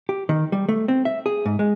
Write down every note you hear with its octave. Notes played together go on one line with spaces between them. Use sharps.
G4
D#3
G3
A3
C4
E5
G#4
G#2
G#3